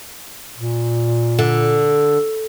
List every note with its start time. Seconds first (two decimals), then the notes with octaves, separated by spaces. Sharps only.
0.58 A#2
1.39 D3